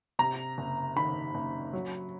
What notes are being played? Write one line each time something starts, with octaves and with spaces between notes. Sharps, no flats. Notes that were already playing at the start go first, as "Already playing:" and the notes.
C3 A#5
F#1
D#3 B5
F#1
F#3